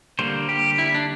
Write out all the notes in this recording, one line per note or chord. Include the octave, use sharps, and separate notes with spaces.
D3 G3 A#3 C5
G4
E4
D4